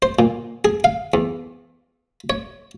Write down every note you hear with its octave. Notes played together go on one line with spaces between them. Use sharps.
C5
A#2
G#4
F5
E2
C#5